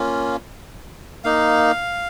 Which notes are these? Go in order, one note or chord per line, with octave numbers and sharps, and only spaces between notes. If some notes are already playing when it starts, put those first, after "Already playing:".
Already playing: A#3 C#4 F4
A#3 D#4 F5